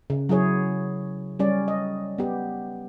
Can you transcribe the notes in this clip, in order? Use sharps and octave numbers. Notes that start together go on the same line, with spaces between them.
C#3
F#3 E4 G#4 C#5
G3 C#4 D5
D#5
B3 G4